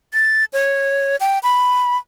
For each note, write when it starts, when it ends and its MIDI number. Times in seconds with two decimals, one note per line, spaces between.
0.14 0.44 93
0.53 1.16 73
1.20 1.39 79
1.43 1.97 83